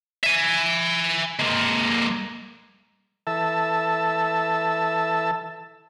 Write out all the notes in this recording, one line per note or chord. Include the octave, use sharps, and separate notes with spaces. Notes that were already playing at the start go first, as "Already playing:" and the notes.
E5 G#5
G#3 A#3
E3 A4 E5 A5 E6